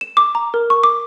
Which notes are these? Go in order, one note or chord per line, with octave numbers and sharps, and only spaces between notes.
E7
D6
A#5
A#4
C#6
D6